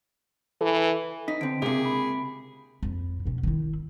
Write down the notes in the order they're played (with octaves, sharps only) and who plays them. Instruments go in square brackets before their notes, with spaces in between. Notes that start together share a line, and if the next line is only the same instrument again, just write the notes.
[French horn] E3 [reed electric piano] A4
[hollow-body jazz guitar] D#4 [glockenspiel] B6
[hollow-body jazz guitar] D3 C4 [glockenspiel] D7
[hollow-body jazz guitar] C#2 A#3 [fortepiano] C3 [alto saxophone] G#4
[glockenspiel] B5
[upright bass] F2
B2 C#4
D#3 E4